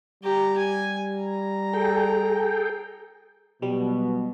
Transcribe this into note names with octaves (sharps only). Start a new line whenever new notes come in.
G3 G4 A#5
G#5
A#5
G#4 A4 G5
B2 F#3 G3